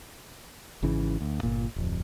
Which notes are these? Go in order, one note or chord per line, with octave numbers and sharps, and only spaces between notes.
G#1 C#3 E3
D2
G1 A#2
D1 F2